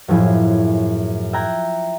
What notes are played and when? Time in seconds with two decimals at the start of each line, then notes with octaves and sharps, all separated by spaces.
0.08 F#2 A2 F3 E4 G#4
1.33 E5 G5 A#5 F#6 G#6